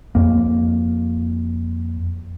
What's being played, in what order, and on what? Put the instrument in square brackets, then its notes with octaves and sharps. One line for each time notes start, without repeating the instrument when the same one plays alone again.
[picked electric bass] F2 A#3